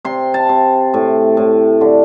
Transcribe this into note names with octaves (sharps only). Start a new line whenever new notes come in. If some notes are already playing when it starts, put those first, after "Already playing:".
C3 C6
A5
C3
A2
A2
D3